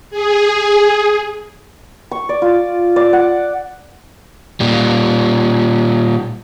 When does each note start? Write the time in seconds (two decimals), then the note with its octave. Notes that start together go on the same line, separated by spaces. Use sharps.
0.11 G#4
2.11 C#6
2.29 D5
2.42 F4
2.96 D5
3.13 F#5
4.60 A#2 G3